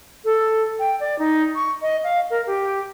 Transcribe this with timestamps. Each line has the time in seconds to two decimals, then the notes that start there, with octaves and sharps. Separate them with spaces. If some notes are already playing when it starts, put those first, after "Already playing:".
0.25 A4
0.79 G5
1.00 D5
1.19 D#4
1.55 C#6
1.82 D#5
2.04 F5
2.30 A#4
2.47 G4